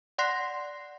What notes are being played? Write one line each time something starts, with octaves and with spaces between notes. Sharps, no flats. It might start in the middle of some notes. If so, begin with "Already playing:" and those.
D5 F#5 C6 F#6 A#6 C7